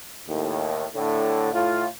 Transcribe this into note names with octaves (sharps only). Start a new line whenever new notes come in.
D#2 A2
A2 D3
A2 F4